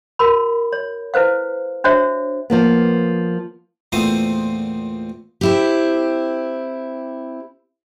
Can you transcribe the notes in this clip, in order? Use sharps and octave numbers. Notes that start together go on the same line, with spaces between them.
F#4 A#4 B5
C#5
E4 B4 C5 F5
D4 F#4 C5 C#5 E5
F3 A#3 B3
E2 A#2 A3 C4 C5 D#6
C4 E4 G4